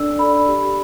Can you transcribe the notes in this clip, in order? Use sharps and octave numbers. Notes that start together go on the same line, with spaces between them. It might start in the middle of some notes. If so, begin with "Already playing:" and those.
Already playing: D4 A4 D5 E6
A4 D5 B5
G4